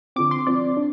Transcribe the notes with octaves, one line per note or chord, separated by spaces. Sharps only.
D3 F3 C4 D6
C6
C3 F3 C4 D5
D4